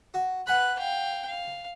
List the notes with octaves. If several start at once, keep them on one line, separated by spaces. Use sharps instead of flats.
F#4
B4 F#5 G#5 B5 F#6
F5 G5
F5